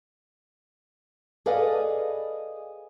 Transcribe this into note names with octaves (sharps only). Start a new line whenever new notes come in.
G#4 A4 B4 D5 D#5 F5